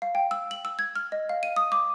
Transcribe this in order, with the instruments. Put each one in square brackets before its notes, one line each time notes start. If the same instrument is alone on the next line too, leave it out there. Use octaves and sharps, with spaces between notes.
[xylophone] F5
G5
E6
F#7
E6
G#6
F6
D#5
F5
D#7
D#6
D6